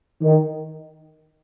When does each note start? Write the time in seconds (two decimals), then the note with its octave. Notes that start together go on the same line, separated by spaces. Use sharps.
0.22 D#3